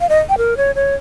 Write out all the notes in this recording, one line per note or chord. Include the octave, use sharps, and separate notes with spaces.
F5
D#5
G5
A#4
C#5
C#5